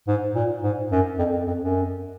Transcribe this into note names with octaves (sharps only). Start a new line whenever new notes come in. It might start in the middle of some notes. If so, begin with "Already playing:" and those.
G#2
A#2
G#2
F#2
F2
F2
F2
F#2